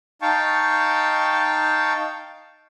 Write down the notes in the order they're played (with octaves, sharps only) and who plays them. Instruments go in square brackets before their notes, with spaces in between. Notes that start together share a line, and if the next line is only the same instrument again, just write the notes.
[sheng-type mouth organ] D#4 F5 G5 A5 C#6